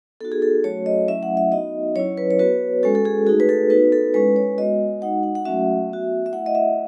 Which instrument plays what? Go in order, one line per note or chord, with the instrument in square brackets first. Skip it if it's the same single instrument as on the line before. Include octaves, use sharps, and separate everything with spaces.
[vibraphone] B3 D#4 F#4 A4
G#4
A4
F#3 A3 C#4 F#4 C#5
D#5
F#3 A3 C#4 E4 E5
F#5
E5
B3 D#4 F#4 D#5
F#3 C#4 E4 C#5
B4
C#5
B3 F#4 B4
G#3 C#4 F#4 A4
A4
G#4
A3 D#4 F#4 G#4
B4
A4
B3 D#4 F#4 B4
A4
G#3 C#4 E4 B4
C#5
G#3 B3 F#4 D#5
G#3 D#4 F#4 F#5
F#5
F#5
F#3 A3 C#4 F#4 E5
B3 F#4
E5
A3 E4 F#5
D#5
E5